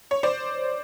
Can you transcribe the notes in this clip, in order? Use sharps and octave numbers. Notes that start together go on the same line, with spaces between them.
C#5
C5 D5